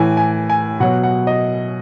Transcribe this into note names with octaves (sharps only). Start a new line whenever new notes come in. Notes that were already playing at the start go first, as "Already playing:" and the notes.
Already playing: A2 E3 G#5
G#5
G#5
B2 F#3 F#5
F#5
D#5